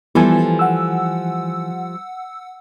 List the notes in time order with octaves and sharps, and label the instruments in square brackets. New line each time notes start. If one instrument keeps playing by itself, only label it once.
[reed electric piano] E3 G#5 [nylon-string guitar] F3 G3 A4 [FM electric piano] B3
[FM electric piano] F#5 E6